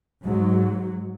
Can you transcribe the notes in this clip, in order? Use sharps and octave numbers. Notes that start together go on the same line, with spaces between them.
G#2 F#3